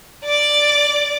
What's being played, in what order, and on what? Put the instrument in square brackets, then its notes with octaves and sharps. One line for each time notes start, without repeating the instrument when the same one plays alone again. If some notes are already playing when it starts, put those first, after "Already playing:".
[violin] D5 D6